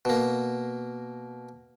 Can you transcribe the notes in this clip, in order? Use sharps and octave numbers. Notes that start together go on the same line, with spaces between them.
B2 A#3